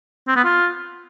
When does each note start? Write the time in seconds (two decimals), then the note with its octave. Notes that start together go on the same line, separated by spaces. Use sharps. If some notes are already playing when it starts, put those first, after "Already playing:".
0.28 C4
0.36 B3
0.44 F4